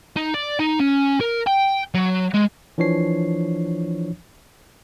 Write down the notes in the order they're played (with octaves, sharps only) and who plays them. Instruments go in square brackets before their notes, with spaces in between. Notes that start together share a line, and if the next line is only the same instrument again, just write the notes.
[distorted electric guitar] D#4
D5
D#4
C#4
A#4
G5
F#3
G#3
[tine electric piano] E3 F3 D4 C#5 C7